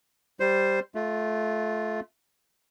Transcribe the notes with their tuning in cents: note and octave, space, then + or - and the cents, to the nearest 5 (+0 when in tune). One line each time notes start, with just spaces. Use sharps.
G3 +0 C5 +0
A3 -20 F4 +0